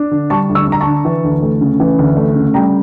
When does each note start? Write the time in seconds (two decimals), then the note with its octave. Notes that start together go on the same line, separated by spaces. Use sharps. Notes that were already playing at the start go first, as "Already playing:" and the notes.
Already playing: D4
0.11 D3
0.30 G3 A5 C#6
0.49 D2
0.55 C#6 E6
0.68 D4 A#5
0.80 A5 C#6
0.87 D3
1.05 E3
1.24 D2
1.42 A3
1.61 C#3
1.80 E3
1.99 D2
2.17 A3
2.35 C#3
2.54 G3 G5 A#5